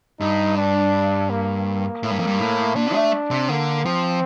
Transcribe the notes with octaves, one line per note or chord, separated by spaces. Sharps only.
G2 D#4
D4
A#3
A2
G2
F2
G2
A2
A#2 D4
A3
C3
D3 A#3
F3 C4